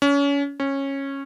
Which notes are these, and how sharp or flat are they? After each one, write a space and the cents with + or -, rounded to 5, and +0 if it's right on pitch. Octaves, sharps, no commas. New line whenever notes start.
C#4 +30
C#4 -15